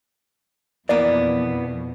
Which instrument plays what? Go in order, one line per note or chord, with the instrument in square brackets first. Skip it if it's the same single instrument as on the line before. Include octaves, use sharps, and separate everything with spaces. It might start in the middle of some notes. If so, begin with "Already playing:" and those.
[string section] F2 B2 [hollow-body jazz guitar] E3 A#3 B3 [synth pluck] D5